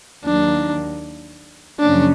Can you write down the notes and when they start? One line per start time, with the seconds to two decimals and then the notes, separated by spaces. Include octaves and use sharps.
0.25 D#2 D#3 F#3 A#3 D4
1.79 F#2 C#3 F3 A#3 C#4 D4